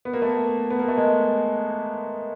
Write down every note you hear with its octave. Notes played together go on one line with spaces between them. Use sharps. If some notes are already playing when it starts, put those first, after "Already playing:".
B3
A#3
A3 B3
B3
A#3
A3
G#3 A#3